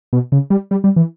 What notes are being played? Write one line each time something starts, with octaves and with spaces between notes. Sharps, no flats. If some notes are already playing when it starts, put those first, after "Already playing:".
B2
C#3
G3
G3
G3
E3